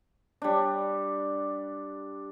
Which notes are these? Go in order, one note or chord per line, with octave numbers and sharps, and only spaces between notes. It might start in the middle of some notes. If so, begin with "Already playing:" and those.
G3 D4